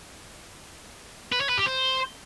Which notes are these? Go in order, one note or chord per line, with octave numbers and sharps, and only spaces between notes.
B4
C#5
B4
G4
C5